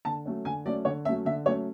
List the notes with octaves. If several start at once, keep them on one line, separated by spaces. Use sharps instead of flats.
D3 A5
F#3 A3 C#4
D3 G#5
F#3 A3 C#4 D5
D3 C#5
F#3 A3 C#4 E5
D3 E5
F#3 A3 C#4 C#5